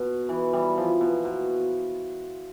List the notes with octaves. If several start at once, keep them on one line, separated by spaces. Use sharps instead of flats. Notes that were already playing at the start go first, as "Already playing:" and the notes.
Already playing: B2
E3
E3 G3
F3
B2
B2